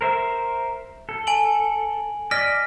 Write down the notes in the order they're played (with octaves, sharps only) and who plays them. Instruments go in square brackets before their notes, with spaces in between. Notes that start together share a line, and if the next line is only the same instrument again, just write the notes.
[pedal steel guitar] A#4 C5 E5
A4
[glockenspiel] G#5 D7 F#7
[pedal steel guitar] D5 D#5 [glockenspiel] F6 A#6 B6